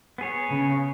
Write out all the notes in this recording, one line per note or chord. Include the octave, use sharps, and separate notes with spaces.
B3 G#4 C#5
C#3